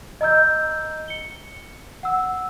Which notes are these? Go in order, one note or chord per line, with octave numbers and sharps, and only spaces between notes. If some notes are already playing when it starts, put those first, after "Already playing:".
D#5 A#5 E6 G6
C#7 G7
F#5 E6